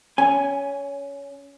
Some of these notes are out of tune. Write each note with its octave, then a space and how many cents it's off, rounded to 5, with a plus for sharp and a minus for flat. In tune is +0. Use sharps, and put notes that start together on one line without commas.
C#4 +20 G#5 +0